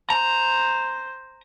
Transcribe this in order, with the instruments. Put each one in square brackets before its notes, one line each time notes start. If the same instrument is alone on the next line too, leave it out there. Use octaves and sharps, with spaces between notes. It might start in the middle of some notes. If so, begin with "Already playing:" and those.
[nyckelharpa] C5 [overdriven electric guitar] A#5